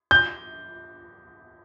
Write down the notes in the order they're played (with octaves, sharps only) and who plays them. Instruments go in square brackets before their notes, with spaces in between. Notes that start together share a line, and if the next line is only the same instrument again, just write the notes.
[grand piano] G6